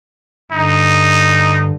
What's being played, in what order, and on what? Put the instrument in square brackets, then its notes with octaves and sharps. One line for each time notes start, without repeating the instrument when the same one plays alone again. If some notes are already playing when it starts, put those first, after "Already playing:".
[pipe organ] G2 D3 [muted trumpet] D#4